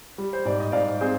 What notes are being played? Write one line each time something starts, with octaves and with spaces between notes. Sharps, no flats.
G3
C5
G#2 D5
D#5
G#2 D5 F5
C4 G#4 C5